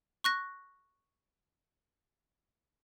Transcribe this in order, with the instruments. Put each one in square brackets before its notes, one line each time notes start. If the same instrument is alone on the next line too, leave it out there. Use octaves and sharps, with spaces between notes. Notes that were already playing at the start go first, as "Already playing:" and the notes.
[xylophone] C#6 F#6 A#6